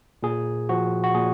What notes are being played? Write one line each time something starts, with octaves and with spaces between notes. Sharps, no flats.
A#2 G#4
F3 F#4
F#4
A#2 G#4